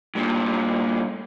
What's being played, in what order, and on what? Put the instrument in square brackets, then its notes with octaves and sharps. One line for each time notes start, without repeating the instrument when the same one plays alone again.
[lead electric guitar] G2 A#2